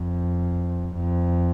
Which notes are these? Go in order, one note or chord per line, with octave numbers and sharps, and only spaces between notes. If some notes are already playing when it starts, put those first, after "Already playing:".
Already playing: F2
F2